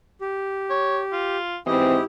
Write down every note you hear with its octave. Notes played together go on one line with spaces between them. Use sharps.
G4
C#5
F4
G#2 E3 C4 E4 G4 D#5